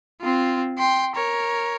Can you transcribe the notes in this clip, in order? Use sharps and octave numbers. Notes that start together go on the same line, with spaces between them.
C4 F4
G5 C6
A#4 C#5